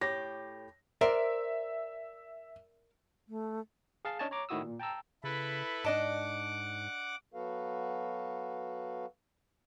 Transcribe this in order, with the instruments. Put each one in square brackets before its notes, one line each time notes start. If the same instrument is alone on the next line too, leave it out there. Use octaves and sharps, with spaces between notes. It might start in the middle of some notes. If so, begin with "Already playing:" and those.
[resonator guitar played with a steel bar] A2 G4 [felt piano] C#5 A#6
[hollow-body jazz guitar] A#4 C5 D5 [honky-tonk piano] E5
[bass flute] A3
[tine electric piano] G#4 F5 A5
C#4 D4 C#5 D#5 G#5 A5
C#5 A#5 D6
A2 D#3 E4 F#4 D#6 E6
A#2
G5 A5 A#5 E6
[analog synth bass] C#3 [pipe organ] E4 A4 B4
[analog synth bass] G#2 [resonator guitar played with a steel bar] D4 D#5 A5 [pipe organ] F#5 D6
[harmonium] F#3 B3 F#4 A4 B4 F5